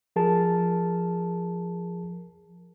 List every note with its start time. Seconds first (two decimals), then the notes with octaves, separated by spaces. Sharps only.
0.16 F3 G#4 A#4 A5